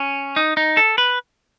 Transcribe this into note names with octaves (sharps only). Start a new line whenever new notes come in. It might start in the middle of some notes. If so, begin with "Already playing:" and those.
Already playing: C#4
D#4
D#4
A4
B4